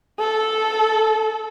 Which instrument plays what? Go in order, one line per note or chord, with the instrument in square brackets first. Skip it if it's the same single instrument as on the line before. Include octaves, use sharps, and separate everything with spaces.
[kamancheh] A4